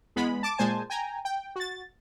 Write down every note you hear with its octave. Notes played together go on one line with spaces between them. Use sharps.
E2 G#3 B3 B5
A5 D6
A#2 G#3 C5 G#5 A5
G5 G#5 A#5
G5
F#4 A6